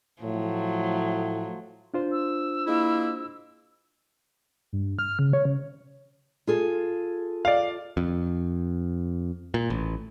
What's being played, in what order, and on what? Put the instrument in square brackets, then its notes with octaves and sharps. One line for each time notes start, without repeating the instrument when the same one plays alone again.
[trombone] A2 [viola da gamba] F3 F#3
[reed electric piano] D4 F4 C5
[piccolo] E6
[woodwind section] G#3 A#3 E4
[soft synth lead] G2
F6
C#3
C#5
C#3
[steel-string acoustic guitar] F4 G#4 A4
[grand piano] D5 F5
[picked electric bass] F2
A#2
A1